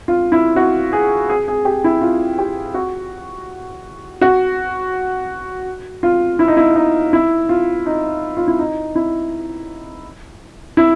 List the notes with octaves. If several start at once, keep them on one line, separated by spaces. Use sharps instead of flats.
F4
E4
F#4
G#4
G#4
G#4
G4
E4
F4
G4
F#4
F#4
F4
E4
D#4
E4
D#4
E4
F4
D#4
F4
E4
D#4
E4
E4